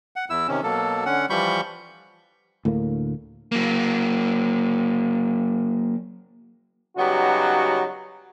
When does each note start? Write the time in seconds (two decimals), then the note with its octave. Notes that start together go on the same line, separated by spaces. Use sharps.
0.16 F#5
0.30 E2 E4 E6
0.48 C3 D#3 C#4
0.63 B2 F#3 A#3 A4
1.06 D3 C#4 F#5
1.30 E3 F3 G3 B5 C#6 G6
2.65 D2 A2 D3 A#3
3.52 F#3 A#3
6.98 C#3 F#3 G3 B3 D#4 F#4